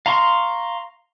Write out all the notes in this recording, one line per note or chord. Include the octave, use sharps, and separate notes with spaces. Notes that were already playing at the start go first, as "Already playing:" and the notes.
F5 A#5 C6 C#6